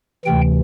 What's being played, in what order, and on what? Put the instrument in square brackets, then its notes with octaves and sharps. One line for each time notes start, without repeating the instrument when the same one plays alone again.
[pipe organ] D2 C3 E3 G5